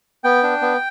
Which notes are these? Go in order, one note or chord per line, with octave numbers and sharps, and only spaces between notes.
B3 G5
D4
B3